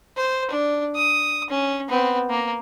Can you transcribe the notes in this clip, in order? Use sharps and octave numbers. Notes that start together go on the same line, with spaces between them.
C5
D4
D#6
C#4
B3 C4
A#3